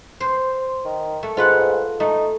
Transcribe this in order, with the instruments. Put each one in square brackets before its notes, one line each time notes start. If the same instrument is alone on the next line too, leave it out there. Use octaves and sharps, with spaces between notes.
[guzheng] C5
[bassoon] D#3
[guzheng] A3
[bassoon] G#2 [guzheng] F4 B4 F#5
[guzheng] A3 [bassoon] D#4